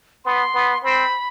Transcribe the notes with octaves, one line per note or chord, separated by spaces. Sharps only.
B3 C6
B3
C4 B5